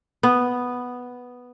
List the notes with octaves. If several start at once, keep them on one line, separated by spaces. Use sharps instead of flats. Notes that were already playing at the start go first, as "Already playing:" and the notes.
B3